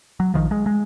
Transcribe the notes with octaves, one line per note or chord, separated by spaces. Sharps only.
F#3
A#1 D#2 D#3 F3
G#3
G#3